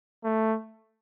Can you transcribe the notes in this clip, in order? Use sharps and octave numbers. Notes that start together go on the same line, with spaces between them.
A3